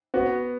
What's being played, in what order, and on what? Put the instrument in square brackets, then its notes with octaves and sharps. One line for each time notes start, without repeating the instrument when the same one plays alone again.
[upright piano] B3 [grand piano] F#4